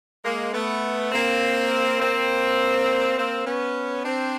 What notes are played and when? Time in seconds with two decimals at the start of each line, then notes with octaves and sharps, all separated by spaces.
0.24 G#3 A#3
0.53 A3 B3
1.12 A#3 C4
2.00 A#3 C4
3.16 A#3 C4
3.45 B3 C#4
4.04 C4 D4